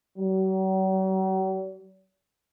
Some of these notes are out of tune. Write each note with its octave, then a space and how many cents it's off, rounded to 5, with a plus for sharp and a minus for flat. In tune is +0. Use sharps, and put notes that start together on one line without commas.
F#3 +45